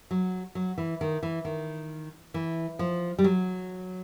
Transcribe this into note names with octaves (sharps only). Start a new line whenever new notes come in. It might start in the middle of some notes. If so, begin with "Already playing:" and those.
F#3
F#3
E3
D#3
E3
D#3
E3
F3
G3
F#3